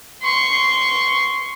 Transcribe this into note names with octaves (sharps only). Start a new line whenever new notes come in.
C6 C#6